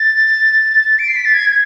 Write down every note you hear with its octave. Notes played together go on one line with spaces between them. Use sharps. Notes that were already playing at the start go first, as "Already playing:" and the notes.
Already playing: A6
D7
C7
B6
A6
G#6
G#6